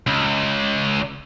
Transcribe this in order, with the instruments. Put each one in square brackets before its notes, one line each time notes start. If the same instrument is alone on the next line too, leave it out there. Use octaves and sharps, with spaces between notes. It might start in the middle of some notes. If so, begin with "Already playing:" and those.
[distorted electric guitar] C#2